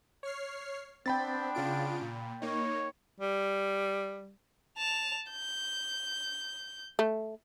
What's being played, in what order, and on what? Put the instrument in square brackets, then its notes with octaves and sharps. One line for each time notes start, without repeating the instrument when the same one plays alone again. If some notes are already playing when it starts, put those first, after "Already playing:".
[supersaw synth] C#5 F6 C7
[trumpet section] B3 D4 [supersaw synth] C4 [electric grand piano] G5 B5 A6
[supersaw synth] C#3 F4 D7
A#2
[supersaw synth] A#3 D#4 [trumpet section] C#5
[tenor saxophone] G3
[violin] A5 F7
G6
[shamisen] A3